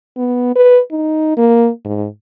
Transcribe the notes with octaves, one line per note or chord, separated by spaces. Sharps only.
B3
B4
D#4
A#3
G#2